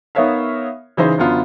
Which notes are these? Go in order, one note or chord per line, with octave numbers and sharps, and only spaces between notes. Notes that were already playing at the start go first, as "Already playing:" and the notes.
B3 D#4 A#4 C#5 E5 F5
C#3 E3 D#4 C5
F#2 D3 B3 F4